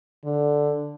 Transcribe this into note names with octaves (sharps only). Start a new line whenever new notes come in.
D3